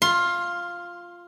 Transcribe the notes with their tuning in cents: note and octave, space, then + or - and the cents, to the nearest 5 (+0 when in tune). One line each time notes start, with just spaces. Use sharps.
F4 +0 C6 +25